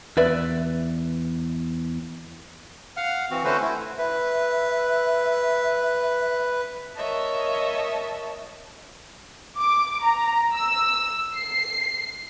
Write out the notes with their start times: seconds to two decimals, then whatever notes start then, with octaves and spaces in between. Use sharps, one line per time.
0.17 E2 B4 D5 E5
2.97 F5 F#5 F6
3.31 E3 C4 F#4
3.44 D3 A3 C#4 F#4 B4 C5
3.61 A3 E4
3.98 B4 E5
6.96 A#4 C#5 D#5 E5 A5
9.58 D6
10.04 A#5
10.55 E6
11.36 C7